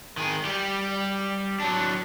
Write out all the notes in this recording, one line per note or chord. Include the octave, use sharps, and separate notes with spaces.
D#3 G#4
G3 G4
F#3 D4